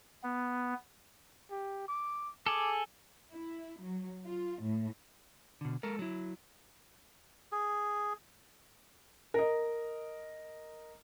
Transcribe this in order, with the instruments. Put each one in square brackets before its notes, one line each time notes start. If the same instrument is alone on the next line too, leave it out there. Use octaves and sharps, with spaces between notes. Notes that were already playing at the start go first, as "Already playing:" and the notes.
[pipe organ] B3
[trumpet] G4
D6
[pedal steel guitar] G#4 A4 [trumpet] D6
[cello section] E4
F#3
F4
A2
[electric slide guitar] B2 D3
G#3 A4 A#4
F#3 E4
[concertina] G#4
[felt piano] A#4 D#5